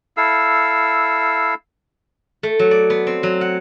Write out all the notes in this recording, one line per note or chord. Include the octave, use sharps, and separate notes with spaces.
E4 A4 F5 E6
A3
F#3
D5
B3
C4
F#3
F#5